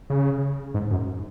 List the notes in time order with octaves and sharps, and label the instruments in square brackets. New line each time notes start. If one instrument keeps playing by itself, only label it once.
[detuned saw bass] C#3
G#2
F#2